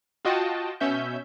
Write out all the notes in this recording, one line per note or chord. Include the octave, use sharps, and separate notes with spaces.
F4 F#4 D#5 G5 A5
B2 C#4 E5 G6